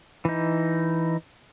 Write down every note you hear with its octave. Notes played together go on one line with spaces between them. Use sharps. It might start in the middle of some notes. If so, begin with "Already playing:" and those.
E3 D#4